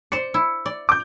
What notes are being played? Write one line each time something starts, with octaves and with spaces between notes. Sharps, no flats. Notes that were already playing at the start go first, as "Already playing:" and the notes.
C5 D5 C#7
E4
D5
D6 G6